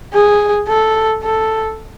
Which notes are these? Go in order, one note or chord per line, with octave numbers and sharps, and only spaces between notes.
G#4
A4
A4